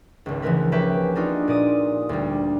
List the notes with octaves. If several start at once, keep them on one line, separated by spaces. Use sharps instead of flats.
G#1 C#2
C#3 E3 F3 A3 A#4 B4
A#3 C#4 G4 B4 E5
D4 D#4 F4 F#4
A#2 D5 D#6 D#7
D2 G3